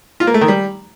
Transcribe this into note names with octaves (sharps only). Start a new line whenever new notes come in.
F4
A#3
A3
D#3
G3